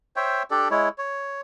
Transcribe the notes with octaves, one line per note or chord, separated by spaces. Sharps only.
C5 C#5 E5 G5
D4 G4 A4 D5
G#3 E4 C#5
C#5